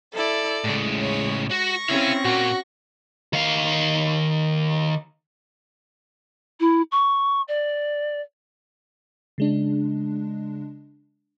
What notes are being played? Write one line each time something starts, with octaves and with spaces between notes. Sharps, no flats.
E4 A4 D5
A2 C#3 G#3
C#5
F#4 C#6 A#6
C4 C#4 E4 C#5 F5
A#2 A#3 F#4
D#3 F5
E4
C#6
D5
C#3 G#3 D4